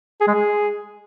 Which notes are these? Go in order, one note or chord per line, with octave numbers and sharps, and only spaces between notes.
G#4
G#3
G#4